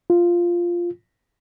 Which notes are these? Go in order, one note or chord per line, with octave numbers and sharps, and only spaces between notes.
F4